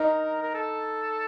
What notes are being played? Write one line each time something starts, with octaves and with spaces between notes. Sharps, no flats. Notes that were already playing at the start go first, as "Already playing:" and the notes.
Already playing: D#4 A#4
A#4
A4